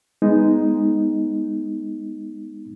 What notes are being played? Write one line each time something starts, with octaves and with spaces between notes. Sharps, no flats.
G#3 B3 D#4